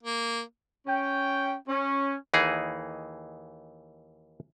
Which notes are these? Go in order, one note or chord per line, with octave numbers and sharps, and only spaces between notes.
A#3
C#4 G5
C#4
D#2 E3 D#4 G#4